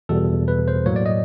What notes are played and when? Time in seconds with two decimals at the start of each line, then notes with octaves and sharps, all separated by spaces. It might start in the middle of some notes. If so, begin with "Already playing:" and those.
0.09 E2 B2 G3 A4
0.48 B4
0.68 C5
0.86 A2 F#3 A#3 C#5
0.96 D5
1.06 D#5